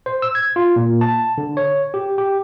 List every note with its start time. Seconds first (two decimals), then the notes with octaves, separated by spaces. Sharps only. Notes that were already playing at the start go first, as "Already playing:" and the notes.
0.06 C5
0.22 E6
0.35 G#6
0.56 F4
0.76 A#2
1.01 A5
1.38 D3
1.57 C#5
1.94 G4
2.18 G4